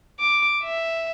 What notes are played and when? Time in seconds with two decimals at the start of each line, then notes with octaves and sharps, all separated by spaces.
0.20 D6
0.63 E5